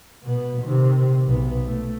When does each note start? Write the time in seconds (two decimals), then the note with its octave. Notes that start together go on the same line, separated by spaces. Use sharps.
0.23 B2 B3
0.62 C3 D#3
1.25 B1 B3
1.66 A3